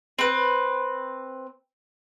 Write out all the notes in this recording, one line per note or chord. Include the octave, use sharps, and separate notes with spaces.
C4 B4